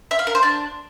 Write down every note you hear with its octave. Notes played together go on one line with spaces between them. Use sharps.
E5
F5
A#4
C5
D4